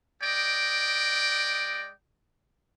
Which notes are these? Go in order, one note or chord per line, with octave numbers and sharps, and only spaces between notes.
G#3 D5 D#5 G5